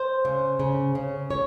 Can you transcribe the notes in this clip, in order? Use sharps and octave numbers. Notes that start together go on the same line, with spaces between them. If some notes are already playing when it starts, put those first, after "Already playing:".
Already playing: C5
C#3
C#3
C#3
C#5